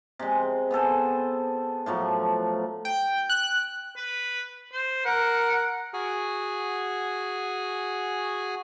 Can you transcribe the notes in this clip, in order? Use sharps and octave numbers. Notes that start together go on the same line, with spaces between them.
C3 G#3
B3 G#4 A4 C5
A2 F3 F#3
G5
F#6
B4
C5
A#4 F#5
F#4 G#4 G#5